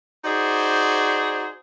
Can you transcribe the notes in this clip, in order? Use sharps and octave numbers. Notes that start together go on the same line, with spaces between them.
D#4 F#4 G#4 C5 D5